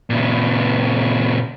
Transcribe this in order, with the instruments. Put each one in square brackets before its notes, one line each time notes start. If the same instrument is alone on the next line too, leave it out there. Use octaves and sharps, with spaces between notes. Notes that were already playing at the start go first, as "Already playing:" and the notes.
[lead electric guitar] A#2 C#3